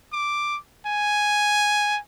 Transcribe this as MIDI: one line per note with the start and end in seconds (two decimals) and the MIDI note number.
0.13 0.57 86
0.87 1.99 80